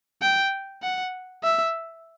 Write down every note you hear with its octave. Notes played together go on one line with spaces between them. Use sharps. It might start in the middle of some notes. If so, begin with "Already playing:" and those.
G5
F#5
E5